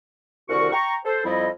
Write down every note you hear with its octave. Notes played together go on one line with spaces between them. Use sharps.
C2 D3 D#3 F#4 A#4 C#6
G5 A#5 C#6
A4 C5
F2 G3 E4 D#5